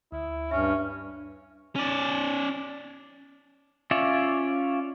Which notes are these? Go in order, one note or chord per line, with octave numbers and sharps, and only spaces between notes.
D2 E4
G2 C#4 E5 F6
C#4 D5
C#4 F4 C#5 D5 E5